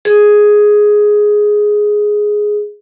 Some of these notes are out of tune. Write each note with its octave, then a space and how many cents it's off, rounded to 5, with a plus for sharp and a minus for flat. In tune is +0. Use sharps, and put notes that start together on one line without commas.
G#4 +5